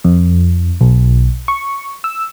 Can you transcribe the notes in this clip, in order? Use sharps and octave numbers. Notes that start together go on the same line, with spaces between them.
F2
B1
C#6
E6